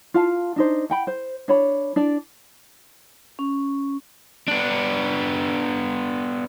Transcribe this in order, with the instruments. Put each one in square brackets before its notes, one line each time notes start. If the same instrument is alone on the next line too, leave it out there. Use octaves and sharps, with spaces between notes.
[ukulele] F4 F5 A5
D4 D#4 C5
F#5 G5 B5
C5
D4 C#5 B5
D4 D5
[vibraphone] C#4
[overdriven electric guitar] B3 D4